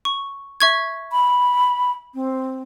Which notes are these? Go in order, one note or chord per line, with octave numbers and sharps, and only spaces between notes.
C#6
E5 C#6 G#6
B5
C4